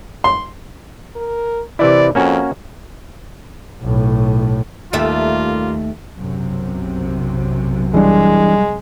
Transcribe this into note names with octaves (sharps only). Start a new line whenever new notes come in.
C6
A#4
C3 E3 E4 D5
F2 A#3 C#4 F#4
B1 A2
D#2 G3 A3 A#3 F4 E5
B1 F#2 C3
E3 G3 G#3 D4